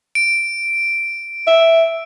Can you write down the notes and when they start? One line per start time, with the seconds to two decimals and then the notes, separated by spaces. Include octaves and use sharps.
0.15 D7
1.47 E5